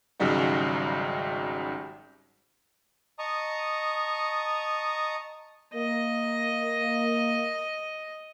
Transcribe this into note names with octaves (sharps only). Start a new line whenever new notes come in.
G#1 C#3 F#3 G3 D#4 F#4
D#5 A5 A#5 C#6 D#6
A#3 D#5